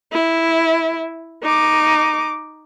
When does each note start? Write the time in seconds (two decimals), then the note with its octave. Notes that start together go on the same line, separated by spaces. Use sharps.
0.12 E4
1.43 D#4 D6